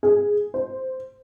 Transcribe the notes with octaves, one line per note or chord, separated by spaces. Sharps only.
G#4
C5